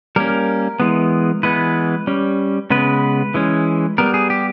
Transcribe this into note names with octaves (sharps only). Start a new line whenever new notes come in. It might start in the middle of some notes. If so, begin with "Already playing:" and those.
G3 A#3 C#4 A#4
E3 G#3 B3
E3 G#3 B3 B4
G3 C#4
C#3 G#3 B3 B4
E3 G#3 C#4
G3 B3 A#4
G#4
G4